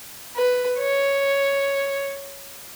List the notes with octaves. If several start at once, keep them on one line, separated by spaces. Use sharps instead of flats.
B4
C#5